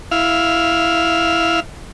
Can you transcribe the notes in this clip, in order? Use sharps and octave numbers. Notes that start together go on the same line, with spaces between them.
E4 F5